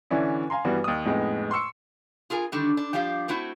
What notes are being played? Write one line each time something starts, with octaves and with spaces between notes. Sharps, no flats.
D3 E3 C#4 D4 E4
F5 G#5 A#5 C6
G2 E3 G3 B3 F#4
D#2 D#6
F2 A2 G#3 B3 D#4
C6 C#6 E6 C#7
F4 G#4 A#4 G#5
D3 D#3 G3 D4
D4
F3 G3 D4 G4 F5
A3 C4 E4 F#4